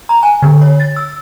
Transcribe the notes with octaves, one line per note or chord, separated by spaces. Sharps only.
A#5
G#5
D3
C#5
A6
E6